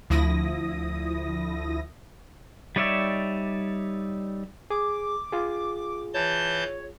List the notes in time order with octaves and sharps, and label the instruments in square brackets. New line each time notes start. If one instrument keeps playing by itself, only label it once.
[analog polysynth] D2 F3 E4 D#6 A#6
[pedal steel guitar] G3 D#4 C#5 D5 E5
[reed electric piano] G#4 [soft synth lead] D6
[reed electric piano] F4 G#4
[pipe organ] E3 A5 G6 [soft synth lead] C#5